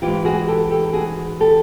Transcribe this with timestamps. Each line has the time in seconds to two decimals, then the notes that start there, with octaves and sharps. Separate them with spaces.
0.02 G#2 E3 F4 G4
0.25 F#4 G#4
0.48 G4 A4
0.71 G4 A4
0.93 F#4 G#4
1.40 G4 A4